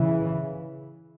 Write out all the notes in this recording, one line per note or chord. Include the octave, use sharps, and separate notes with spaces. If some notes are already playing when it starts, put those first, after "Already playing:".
Already playing: C#3 E3